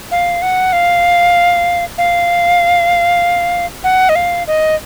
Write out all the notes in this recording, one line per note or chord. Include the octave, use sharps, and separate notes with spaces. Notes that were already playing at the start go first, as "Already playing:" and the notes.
F5
F#5
F5
F5
F#5
D#5
F5
D#5